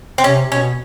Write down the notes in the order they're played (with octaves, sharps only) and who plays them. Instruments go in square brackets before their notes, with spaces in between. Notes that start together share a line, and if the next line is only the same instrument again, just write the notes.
[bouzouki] C4
[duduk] C3 [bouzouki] C#4
[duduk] B2 [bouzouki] C#4